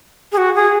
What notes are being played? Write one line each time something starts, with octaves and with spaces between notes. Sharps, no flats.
G#4
F#4
G#4